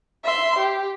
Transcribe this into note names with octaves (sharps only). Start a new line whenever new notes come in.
E5 C6
G4